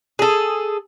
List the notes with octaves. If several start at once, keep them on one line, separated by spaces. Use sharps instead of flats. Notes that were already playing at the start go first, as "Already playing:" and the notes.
G#4 A4